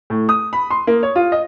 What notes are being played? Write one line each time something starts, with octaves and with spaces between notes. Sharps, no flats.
A2
D#6
B5
C6
A#3
C#5
F4
D#5